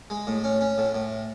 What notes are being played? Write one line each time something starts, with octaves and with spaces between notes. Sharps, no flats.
G#3
A2
C#4
C#4
A2
A2